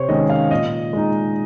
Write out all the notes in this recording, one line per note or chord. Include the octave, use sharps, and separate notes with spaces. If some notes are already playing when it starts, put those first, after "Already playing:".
Already playing: C3 C5 C#5
D#3 G#3 C#4 D#5
F5
A#2 D#5
G#3 D#4